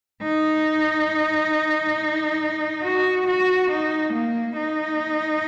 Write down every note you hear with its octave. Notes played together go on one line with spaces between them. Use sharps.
D#4
F#4
F#4
D#4
A#3
D#4